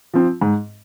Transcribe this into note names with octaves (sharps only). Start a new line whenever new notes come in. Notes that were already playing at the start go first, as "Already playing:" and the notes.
F3 C4
G#2